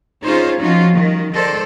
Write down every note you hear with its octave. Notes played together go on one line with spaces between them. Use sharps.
C#4 D#4 F4 G#4 C5 C#5
F3 C#4 D#4 F4 F#4
D#3 G3
D#3 G#3 A4 C5 D5